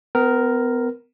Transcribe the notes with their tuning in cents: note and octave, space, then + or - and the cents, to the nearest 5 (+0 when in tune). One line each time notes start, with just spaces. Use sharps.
B3 +35 A#4 +0